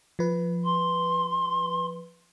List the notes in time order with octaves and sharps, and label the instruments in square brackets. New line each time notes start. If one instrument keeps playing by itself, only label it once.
[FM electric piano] F3 B4
[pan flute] C6